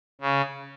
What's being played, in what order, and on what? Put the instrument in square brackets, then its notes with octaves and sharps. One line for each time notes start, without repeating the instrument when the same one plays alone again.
[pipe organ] C#3